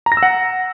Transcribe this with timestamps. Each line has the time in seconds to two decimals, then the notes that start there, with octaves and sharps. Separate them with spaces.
0.06 A#5
0.12 A#6
0.17 E6
0.23 F#5